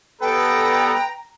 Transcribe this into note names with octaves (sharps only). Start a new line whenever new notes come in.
G3 B3 A4 B4 G5 A#5